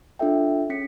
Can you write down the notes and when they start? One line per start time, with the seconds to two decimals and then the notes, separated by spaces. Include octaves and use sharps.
0.19 D4 F4 A4 E5 G5
0.70 C#4 G#4 B6 C#7